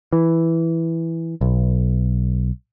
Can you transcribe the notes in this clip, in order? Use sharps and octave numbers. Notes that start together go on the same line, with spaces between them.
E3
B1